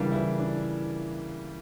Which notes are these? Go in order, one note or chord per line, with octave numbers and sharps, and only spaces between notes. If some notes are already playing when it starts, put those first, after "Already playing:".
Already playing: C#3 E3 G3 A#3 D4
E3 E4
D4